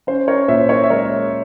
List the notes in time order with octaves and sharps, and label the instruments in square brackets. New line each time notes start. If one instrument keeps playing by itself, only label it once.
[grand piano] C#4 C5
A#4 C#5
A#2 C5 E5
A#4 C#5
E5
G#3 A#4 C#5